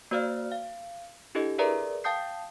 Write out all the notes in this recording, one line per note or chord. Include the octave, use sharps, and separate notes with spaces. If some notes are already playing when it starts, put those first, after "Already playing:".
A#3 F#4 C5 D5 F5 F6
F5
D4 E4 G4 A4 D#5
G#4 A#4 B4 D5 E5 A#5
F5 G5 A5 D#6 G6 C7